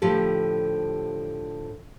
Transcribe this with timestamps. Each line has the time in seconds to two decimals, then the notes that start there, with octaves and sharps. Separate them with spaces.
0.02 A2 D3 F3 G4 A4